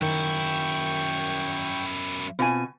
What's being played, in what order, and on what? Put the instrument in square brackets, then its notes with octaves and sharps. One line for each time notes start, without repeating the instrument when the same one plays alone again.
[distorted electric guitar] F#2 E4 [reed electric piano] D#3 A#4 [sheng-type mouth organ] G5 C#6
[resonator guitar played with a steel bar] B2 G#5 [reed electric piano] C4 F4